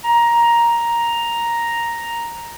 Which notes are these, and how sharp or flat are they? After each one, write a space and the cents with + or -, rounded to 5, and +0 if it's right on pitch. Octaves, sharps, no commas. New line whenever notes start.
A#5 +5